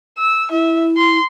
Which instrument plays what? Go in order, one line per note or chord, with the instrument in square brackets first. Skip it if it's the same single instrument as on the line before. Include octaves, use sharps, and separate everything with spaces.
[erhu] E6
[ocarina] E4 [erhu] E5
[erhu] C6